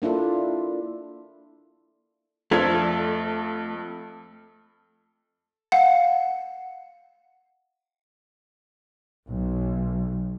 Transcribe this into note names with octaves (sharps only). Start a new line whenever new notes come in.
A#3 D4 E4 F4 A4
F2 A3 D4 F4 A4 C5 G#6 F7
F5 F#5
B1